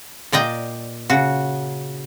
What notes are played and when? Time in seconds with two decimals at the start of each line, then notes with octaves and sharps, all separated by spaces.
0.32 A#2 D5 D#5 G5
1.10 C#3 F#4